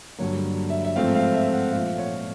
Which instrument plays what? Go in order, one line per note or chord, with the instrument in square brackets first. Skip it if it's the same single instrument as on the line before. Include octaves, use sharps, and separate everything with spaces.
[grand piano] G2 D3 F#3 A#3 C#5
E5
E5
G#2 F3 A3 C4 F5
F5
E5
F#5
A#2 F3 A3 F5
C#5